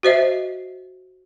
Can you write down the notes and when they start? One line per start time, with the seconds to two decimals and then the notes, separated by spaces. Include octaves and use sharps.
0.03 F#4 C5 D#5 E5